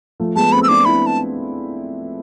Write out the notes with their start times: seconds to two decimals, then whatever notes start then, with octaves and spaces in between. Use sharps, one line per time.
0.20 F3 A3
0.36 G#3 B3 A5
0.52 A3 C4 B5
0.63 E6
0.68 B3 D4 D6
0.85 C4 E4 B5
1.06 A5